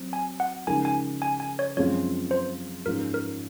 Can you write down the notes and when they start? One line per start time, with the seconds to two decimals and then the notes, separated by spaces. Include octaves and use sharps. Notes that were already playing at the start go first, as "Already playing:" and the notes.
Already playing: F#3 C4
0.13 G#5
0.40 F#5
0.67 C#3 F3 G#3 D#4 A#4 G#5
0.85 G#5
1.22 G#5
1.40 G#5
1.59 C#5
1.77 F#2 F3 G#3 C4 F4 C#5
2.31 C5
2.86 G#2 F3 G#3 C#4 F4 A#4
3.14 A#4